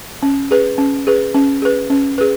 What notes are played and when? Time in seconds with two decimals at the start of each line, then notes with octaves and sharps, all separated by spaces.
0.23 C#4
0.51 G#4 B4
0.78 C#4
1.07 G#4 B4
1.35 C#4
1.62 G#4 B4
1.90 C#4
2.18 G#4 B4